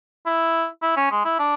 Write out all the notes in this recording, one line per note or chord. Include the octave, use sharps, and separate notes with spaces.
E4
E4
C#4
G#3
E4
D4